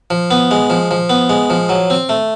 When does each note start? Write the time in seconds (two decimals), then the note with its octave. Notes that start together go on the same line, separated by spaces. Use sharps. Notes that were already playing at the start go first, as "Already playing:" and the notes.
0.10 F3
0.31 B3
0.51 G#3
0.70 F3
0.91 F3
1.10 B3
1.29 G#3
1.50 F3
1.69 F#3
1.90 C4
2.09 A3